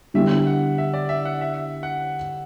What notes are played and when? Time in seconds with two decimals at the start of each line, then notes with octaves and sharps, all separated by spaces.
0.14 D3 G3 B3 E4 G4 E5
0.47 F#5
0.78 E5
0.94 D5
1.09 E5
1.25 F#5
1.41 E5
1.83 F#5